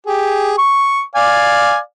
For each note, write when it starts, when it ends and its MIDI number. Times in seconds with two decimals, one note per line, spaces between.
0.06 0.55 67
0.06 0.55 68
0.59 1.02 85
1.15 1.78 74
1.15 1.78 77
1.15 1.78 80